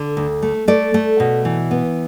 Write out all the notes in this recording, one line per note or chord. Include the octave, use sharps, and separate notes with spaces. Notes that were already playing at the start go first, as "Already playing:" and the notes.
Already playing: D3
D2
A3
A3 D5
A3
B2
E3
B3